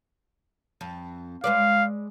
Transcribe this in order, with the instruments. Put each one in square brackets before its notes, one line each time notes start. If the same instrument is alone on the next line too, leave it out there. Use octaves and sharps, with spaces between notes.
[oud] F2
[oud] G#3 B4 D5 [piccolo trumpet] F5